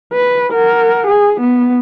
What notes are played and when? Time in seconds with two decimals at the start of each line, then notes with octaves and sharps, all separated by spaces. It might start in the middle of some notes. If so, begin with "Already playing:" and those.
0.13 B4
0.53 A#4 F#5
1.07 G#4
1.40 B3